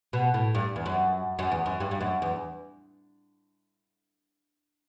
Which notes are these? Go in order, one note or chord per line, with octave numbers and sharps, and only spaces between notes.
B2
A2
G2
E2
F#2
F#2
E2
F#2
G2
G2
F#2
E2